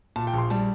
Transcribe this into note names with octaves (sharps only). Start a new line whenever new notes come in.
A#2 A5
G5
A#1
C6
G3 A5